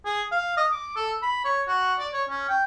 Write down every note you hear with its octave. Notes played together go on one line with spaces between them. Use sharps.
G#4
F5
D#5
D6
A4
B5
C#5
F#4
D5
C#5
C#4
G5